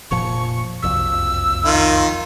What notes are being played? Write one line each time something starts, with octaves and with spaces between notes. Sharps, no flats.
F1 A#2 F3 C#6
F#1 C2 F2 E6
D#3 F4